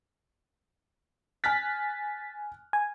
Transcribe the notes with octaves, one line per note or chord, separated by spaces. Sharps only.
G#5 F6 F#6 A6 B6
G#5